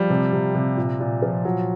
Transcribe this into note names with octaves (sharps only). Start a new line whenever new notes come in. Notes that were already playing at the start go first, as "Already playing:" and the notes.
Already playing: F3 G3
C3
C3
C3
A#2
A#2
F3
A#2 F#3